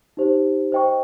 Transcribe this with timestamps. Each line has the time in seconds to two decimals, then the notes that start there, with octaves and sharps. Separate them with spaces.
0.17 D#4 G4 C5
0.72 C5 D#5 G5 C#6